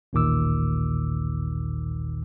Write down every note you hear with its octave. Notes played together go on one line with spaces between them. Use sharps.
A1 D#2 A#2 D#3 D6 E6